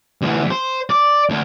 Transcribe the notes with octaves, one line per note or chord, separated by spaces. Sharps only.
D2 E3
C5
D5
D2